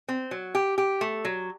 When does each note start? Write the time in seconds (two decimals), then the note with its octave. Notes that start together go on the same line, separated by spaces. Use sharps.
0.08 C4
0.31 F#3
0.55 G4
0.78 G4
1.01 A3
1.25 F#3